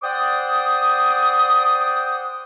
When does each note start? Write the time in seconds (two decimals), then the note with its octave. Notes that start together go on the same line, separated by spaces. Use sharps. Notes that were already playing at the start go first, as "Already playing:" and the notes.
0.03 C5 D5 F#5 G5 D6 D#6